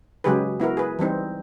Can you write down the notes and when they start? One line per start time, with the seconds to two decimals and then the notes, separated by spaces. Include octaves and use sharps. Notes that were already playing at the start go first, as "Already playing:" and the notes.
0.24 C#3 F#3 G#3 G4 G#4 B4
0.60 B3 E4 F#4 A#4
0.77 G#4 B4
0.99 E3 G3 C4 D#4